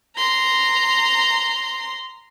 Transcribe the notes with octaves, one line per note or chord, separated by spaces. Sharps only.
A#5 C6